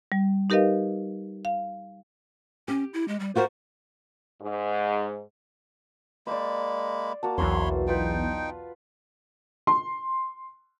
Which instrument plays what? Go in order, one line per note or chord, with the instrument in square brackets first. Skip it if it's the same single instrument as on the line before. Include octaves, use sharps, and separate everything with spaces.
[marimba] G3
D#4 G4 A#4 B4 D#5 F5
F5
[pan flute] C#4 [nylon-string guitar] G4
[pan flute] E4
G#3
G3
[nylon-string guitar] F4 F#4 A#4 [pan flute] C5
[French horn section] G#2
[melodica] G#3 A#3 B5 [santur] C5 D5
[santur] A#3 F#4 A5
[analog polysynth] B1 E2 [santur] C5 [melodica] C#5 B5 C6
[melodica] D#4 G5 [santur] F4 B4
[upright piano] C6